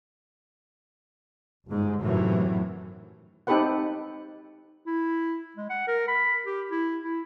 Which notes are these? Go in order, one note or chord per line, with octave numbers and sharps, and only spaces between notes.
G1 G#2
F#2 A2 C3 D#3 E3 F#3
C4 D#4 G4 A4 B4 F#5
E4
G#3
F#5
A#4
B5
G4
E4
E4